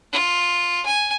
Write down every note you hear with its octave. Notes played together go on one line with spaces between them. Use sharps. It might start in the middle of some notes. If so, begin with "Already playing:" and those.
F4
G#5